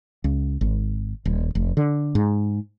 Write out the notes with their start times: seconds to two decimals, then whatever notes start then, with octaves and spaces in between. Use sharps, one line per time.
0.24 C#2
0.61 G#1
1.25 D#1
1.55 F1
1.77 D3
2.15 G#2